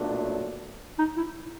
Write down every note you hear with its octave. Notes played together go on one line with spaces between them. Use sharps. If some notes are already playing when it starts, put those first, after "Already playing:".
Already playing: B1 A#2 F#3 A3 D4
D#4
E4